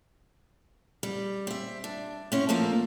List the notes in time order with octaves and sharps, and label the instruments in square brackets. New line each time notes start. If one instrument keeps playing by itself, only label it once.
[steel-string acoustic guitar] G3
C4 E5
D4
C4 C#4 E4
F3 A3 A#3 A4 A#4